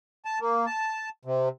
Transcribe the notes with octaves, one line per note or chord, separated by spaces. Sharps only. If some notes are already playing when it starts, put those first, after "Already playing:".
A5
A#3
A5
C3